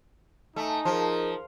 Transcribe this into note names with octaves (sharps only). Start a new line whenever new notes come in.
A3 D#4 G#5
F3 G#4 A#4